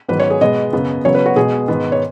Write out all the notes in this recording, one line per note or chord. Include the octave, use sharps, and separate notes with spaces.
G#2 D#3 F#3 B3 B4
C#5
G#4
B2 G#3 B3 D#5
F#2 C#3 B3
C#3 F#3 B3 C#5
B4
F#4
B2 G#3 B3 G#4
G#2 D#3 B3
C#5